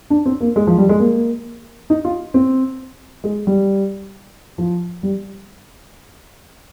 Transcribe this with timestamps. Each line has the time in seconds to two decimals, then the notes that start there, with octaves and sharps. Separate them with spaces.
0.10 D4
0.26 C4
0.41 A#3
0.56 G#3
0.67 F3
0.78 G3
0.89 G#3
1.00 A#3
1.90 D#4
2.05 F4
2.34 C4
3.24 G#3
3.47 G3
4.58 F3
5.03 G3